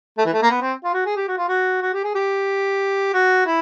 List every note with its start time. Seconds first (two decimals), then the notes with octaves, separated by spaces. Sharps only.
0.18 A3
0.26 E3
0.34 A3
0.42 A#3
0.51 B3
0.61 C4
0.84 F4
0.94 F#4
1.06 G#4
1.16 G4
1.28 F#4
1.38 F4
1.49 F#4
1.82 F#4
1.94 G4
2.04 G#4
2.15 G4
3.14 F#4
3.46 E4